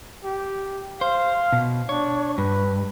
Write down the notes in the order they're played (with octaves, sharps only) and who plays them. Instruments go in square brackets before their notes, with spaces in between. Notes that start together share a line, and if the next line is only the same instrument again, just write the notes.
[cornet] G4
[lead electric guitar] C5 [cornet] F5
[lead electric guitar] B2
[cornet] D4 [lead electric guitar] C#5
[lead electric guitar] G2 [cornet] B4